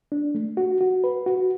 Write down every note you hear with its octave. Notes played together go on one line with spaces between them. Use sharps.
D4
A3
F#4
F#4
B4
F#4